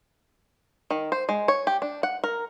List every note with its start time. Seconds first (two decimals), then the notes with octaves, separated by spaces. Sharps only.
0.91 D#3
1.12 C5
1.29 G#3
1.48 C#5
1.67 G4
1.82 D4
2.03 F#5
2.24 A#4